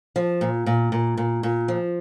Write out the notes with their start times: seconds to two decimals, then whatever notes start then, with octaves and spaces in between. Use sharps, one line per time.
0.16 F3
0.41 A#2
0.66 A#2
0.92 A#2
1.17 A#2
1.43 A#2
1.68 F3